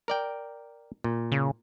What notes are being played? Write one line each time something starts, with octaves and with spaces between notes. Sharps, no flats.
A#4 D5 G5
A#2
C#3